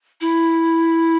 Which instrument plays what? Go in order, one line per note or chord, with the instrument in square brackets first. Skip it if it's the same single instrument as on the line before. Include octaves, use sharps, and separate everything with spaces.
[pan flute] E4